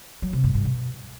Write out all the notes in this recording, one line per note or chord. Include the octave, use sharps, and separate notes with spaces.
F#3
C3
G2
G2
B2